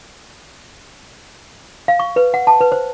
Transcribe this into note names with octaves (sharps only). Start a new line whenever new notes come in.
F5
C#6
B4
F#5
A5
B4
C5